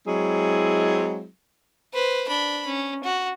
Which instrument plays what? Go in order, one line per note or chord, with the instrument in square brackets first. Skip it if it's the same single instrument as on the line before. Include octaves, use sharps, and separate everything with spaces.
[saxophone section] F#3 G#3 C4 E4 G#4
[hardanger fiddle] B4 C5
D4 B5
C#4
F#4